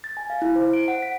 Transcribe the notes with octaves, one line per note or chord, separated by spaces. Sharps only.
A6
G#5
F5
E4
C5
D7
F#5
B6